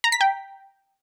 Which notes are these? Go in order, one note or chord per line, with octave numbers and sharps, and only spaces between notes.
A#5
B6
G5